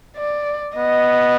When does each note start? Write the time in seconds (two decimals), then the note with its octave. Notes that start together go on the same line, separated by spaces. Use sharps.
0.17 D5
0.76 B3 D#5